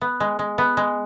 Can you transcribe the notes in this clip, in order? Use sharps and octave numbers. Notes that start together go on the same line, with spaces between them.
B3
G#3
G#3
B3
G#3